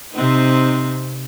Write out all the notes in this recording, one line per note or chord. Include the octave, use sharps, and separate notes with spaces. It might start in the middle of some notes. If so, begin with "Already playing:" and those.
C3 C4 D#4